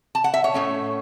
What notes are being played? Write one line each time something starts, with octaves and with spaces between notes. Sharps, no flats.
A5
F#5
E5
C#5
A2 A3 C#4